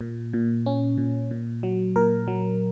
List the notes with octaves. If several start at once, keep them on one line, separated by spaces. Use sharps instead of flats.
A#2
A#2
C#4
A#2
A#2
F#3
A#2 A#4
F#3